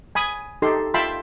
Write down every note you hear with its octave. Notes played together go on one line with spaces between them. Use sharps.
G#5 B5 D#6
D#4 G4 A4 C6
F4 E5 G5 A5 B5 C6